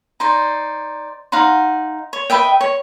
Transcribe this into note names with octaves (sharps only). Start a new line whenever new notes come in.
D#4 C5 D5
D#4 F5 F#5 C6
C#5
B4 D#5 E5 G5
C#5